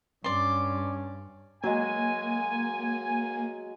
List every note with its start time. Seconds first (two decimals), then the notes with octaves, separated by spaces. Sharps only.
0.24 G2 C#4 D5 C6
1.64 F#3 G#3 A#3 G#5